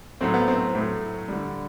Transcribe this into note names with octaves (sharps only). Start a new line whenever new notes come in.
A2 F#3 A3 C4
B3
C4
A2 F#3 A3
D3 G3